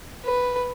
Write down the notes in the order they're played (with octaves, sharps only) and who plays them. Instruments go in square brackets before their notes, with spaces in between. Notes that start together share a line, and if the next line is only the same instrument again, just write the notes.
[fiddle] B4